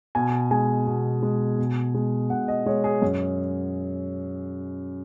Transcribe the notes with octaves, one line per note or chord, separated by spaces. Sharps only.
B2 G#5
G#3 G#5
B2
G#3
B2
G#3
B2 F#5
D#5
G#3 C#5
G#4
F#2